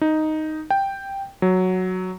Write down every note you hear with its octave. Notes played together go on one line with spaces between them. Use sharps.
D#4
G5
F#3